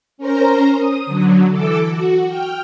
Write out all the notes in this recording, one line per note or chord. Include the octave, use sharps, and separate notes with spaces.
C#4 A#4 C5 A#5
D#6
D3 F#3
E3 A4 D6 E6
F#4
G5 F6